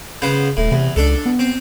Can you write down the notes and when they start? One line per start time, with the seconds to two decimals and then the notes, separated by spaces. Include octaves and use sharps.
0.22 C#3 B3 C5
0.57 D#1 A2
0.71 E2 C3
0.96 C#2 D4 A4
1.26 B3
1.39 C4